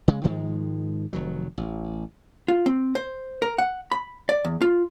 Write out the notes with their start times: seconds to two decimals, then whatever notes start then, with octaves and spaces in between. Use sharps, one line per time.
0.08 C#3 G#3
0.24 G#2 D#3 F3 G#3
1.13 F1 D#3 F#3
1.58 A1
2.48 F4
2.66 C4
2.95 C5
3.42 A#4
3.58 F#5
3.92 B5
4.29 D5
4.45 E2
4.61 F4